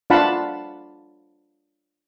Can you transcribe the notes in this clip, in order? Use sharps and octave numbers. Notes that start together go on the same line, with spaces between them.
D4 F4 F5 F#5 A5 B5